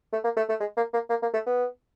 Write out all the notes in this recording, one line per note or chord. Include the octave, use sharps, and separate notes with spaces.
A3
A#3
A3
A3
G#3
A#3
A#3
A#3
A#3
A3
B3